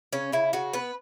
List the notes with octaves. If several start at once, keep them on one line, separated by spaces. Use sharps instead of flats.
C#3 C#4
C#3 E4
C#3 F#4
B3 B4